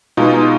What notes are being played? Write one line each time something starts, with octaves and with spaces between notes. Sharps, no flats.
B2 G#3 B3 D#4 F4
D#4